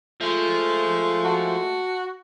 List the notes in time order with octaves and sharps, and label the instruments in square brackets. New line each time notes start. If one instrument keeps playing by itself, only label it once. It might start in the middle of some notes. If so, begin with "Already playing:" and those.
[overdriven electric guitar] F3 [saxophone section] G#3 A3
[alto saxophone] F#4 [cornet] A5